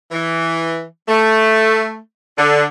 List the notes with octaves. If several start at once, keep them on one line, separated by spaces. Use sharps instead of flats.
E3
A3
D3